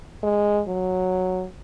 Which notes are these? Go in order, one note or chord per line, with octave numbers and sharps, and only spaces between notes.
G#3
F#3